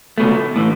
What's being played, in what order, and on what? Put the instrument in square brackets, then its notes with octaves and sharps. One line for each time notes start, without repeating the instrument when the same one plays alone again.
[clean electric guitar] C#2 B2 A3
A2 E3